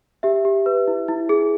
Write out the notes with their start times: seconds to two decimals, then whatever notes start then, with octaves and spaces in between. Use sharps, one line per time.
0.23 G4 E5
0.45 G4
0.66 B4
0.88 E4
1.08 E4
1.29 G#4